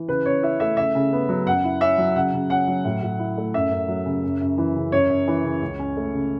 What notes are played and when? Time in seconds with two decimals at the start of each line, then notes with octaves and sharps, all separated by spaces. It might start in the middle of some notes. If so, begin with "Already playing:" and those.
Already playing: E3
0.08 C#3 B4
0.25 C#3 C#5
0.43 E4 E5
0.60 A3 E5
0.77 C#3 E5
0.95 C#3
1.13 B3
1.29 F#3
1.47 F#2 F#5
1.64 E4
1.81 C#4 E5
1.98 F#3
2.15 C#3 F#5
2.33 C#3
2.50 C#4 F#5
2.68 F#3
2.85 A2
3.03 A2
3.19 E4
3.37 A3
3.54 F#2 E5
3.71 F#2
3.88 F#3
4.06 C#3
4.24 F#2
4.41 F#2
4.58 E3
4.76 C#3
4.92 F#2 C#5
5.10 F#2
5.28 E3
5.44 C#3
5.62 C#2
5.79 C#4
5.97 A3
6.14 C#3